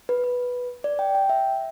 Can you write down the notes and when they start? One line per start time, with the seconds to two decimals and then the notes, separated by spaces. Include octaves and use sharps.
0.09 B4
0.24 B4
0.84 D5
0.99 G5
1.15 G5
1.29 E5